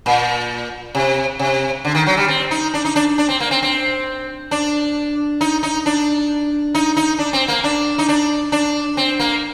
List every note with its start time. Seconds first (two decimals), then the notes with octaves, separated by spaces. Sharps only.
0.06 A#2
0.95 C3
1.39 C3
1.85 D3
1.95 D#3
2.06 F#3
2.17 G3
2.28 C4
2.51 D#4
2.74 D4
2.85 D#4
2.96 D4
3.18 D4
3.29 C4
3.40 A#3
3.51 C4
3.63 C4
4.51 D4
5.41 D#4
5.63 D#4
5.86 D4
6.75 D#4
6.97 D#4
7.19 D4
7.33 C4
7.48 A#3
7.64 D4
7.98 D#4
8.08 D4
8.52 D4
8.97 C4
9.19 A#3